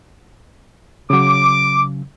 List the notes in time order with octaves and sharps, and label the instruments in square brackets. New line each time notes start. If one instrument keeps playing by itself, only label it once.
[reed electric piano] C#3 F#3 [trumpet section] D6